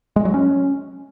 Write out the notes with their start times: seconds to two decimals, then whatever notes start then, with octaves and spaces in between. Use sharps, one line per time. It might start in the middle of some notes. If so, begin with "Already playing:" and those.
0.16 G#3
0.25 F#3
0.34 C#4